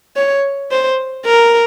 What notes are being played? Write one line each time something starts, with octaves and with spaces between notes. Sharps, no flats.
C#5
C5
A#4